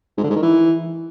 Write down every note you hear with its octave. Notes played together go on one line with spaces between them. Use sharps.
G#2
D3
G#2
D#3
E3